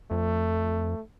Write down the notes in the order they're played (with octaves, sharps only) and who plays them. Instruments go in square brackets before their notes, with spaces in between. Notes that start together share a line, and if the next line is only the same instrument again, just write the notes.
[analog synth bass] F2 [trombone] A3